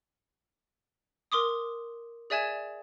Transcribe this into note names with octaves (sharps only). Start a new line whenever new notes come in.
A#4 C6 D6 D#6
G#4 D5 E5 G#5 G#6 E7